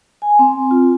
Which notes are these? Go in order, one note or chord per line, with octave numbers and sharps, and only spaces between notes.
G#5
C4
F4